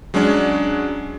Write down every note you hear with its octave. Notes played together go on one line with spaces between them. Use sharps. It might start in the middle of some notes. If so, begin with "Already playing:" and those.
F#3 G#3 C#4 D4